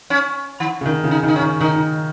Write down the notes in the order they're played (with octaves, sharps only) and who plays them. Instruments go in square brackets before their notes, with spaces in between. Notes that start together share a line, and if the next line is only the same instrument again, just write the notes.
[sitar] C#4
D#3
[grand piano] C#3
D#3
C#3
[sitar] D#4
[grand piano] D#3 [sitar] D#4
[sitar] C#4
[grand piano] D#3
[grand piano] D#3 [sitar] D#4